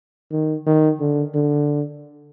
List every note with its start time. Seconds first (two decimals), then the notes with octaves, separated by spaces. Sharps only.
0.31 D#3
0.66 D#3
1.00 D3
1.34 D3